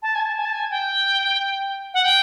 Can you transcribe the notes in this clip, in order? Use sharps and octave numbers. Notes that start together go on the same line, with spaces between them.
A5
G#5
A5
G#5
A5
G#5
G5
F#5
G5